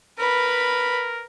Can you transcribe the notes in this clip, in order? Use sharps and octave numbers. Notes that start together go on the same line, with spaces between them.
A#4 B4 B5